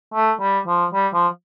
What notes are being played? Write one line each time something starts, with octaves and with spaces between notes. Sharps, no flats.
A3
G3
F3
G3
F3